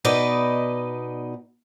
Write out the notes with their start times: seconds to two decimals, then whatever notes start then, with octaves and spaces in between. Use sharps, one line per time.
0.05 B2 D#4 B4 D5 D#5